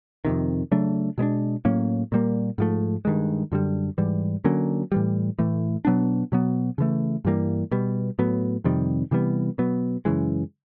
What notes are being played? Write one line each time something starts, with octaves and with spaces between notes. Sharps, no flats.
F2 C3 D#3
C#3 F#3 A3 D4
B2 G#3 B3 D4
A2 F#3 A#3 C#4
A#2 G3 A#3
G#2 F3 A3
G2 D#3 G#3
F#2 D3 G3
G#2 E3 G3
D3 F#3 A#3 C#4
A2 E3 G3
A2 E3 A3
B2 F#3 B3 D4
B2 F#3 B3
C#3 E3 A3
G2 E3 G3 A#3
B2 G3 B3
A2 F#3 B3
F2 C3 D#3 G3
C3 E3 G3 B3
B2 F#3 B3
F#2 C#3 E3 G#3